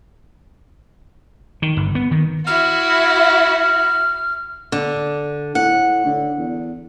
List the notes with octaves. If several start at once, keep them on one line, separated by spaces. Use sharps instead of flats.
D#3
G1
B3
D#3
E4 F#4 F6
D3
A2 F#5
D3
E2